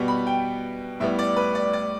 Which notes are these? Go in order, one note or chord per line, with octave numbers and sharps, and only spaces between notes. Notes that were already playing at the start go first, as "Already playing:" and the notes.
Already playing: B2 G3 B3
B5
G5
A2 G3 B3 E5
D5
B4
D5
D5